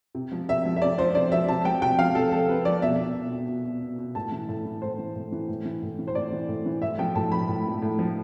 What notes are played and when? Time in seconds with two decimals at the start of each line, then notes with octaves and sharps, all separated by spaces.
0.15 C3
0.32 F3
0.49 C3 E5
0.65 F3
0.76 E5
0.82 C3 D5
0.98 F3 C5
1.15 C3 D5
1.31 F3 E5
1.48 C3 A5
1.65 F3 G5
1.82 C3 G5
1.99 F3 F5
2.15 C3 A4
2.32 F3 A4
2.49 C3 B4
2.65 F3 D5
2.82 B2 E5
2.98 B2
3.15 B2
3.32 B2
3.48 B2
3.65 B2
3.82 B2
3.98 B2
4.15 A2 A5
4.32 E3
4.49 A2
4.65 E3
4.82 A2 C5
4.98 E3
5.15 A2
5.32 E3
5.48 A2
5.65 E3
5.82 A2
5.99 E3
6.07 C5
6.15 A2 D5
6.32 E3
6.48 A2
6.66 E3
6.82 A2 E5
6.99 F3 G5
7.15 A2 A5
7.32 F3 B5
7.48 A2
7.66 F3
7.82 A2
7.99 F3